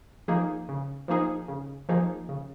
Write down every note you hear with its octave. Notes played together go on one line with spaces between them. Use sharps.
F3 A#3 D#4 G#4
C#3
F3 A#3 D#4 G#4
C#3
F3 A#3 D#4 G#4
C#3